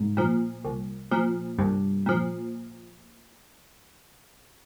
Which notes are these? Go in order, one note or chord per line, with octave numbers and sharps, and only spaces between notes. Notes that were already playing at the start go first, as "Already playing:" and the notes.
Already playing: C2 G#2
A#2 F3
C2
A#2 F3
C2 G2
A#2 F3